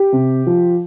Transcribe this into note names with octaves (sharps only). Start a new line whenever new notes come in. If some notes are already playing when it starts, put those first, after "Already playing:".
Already playing: G4
C3
F3